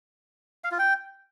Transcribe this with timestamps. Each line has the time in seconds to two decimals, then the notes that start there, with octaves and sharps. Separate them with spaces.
0.64 F5
0.72 F4
0.79 G5